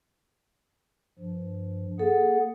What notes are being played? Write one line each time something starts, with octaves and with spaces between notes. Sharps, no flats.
G2 F3
A#3 G#4 A4 F#5